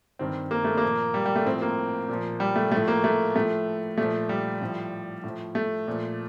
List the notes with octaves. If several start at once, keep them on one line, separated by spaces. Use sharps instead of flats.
G2 D#3 C4
A#3
A3
A#3
A#2 F3
G3
G3
A3
A2 F3 C4
A#3
A#2 F3
G3
A3
A2 F3 A3
A#3
A3
A2 F3 A3
A#2 F3 A3
G3
A2 F3
A2 F3
A3
A#2 F3